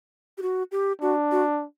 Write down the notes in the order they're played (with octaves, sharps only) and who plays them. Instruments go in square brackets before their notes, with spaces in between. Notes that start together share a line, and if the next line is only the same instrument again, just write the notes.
[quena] G4
F#4
G4
[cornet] D4 [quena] F#4
[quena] F#4